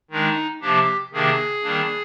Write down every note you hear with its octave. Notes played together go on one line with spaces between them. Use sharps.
D#3 G#3 D4 D#4
C3 F3 A#3 D4 G4
C3 D#3 A#3 D4 G#4
D#3 G3 A#3 D4